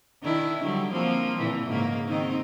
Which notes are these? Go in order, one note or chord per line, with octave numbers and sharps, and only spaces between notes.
D#3 D4 E4
D3 F#3 G3
F3 A#3 C4
A#2 D3 E3
G#2 C#3 A#3
D#3 C4 D#4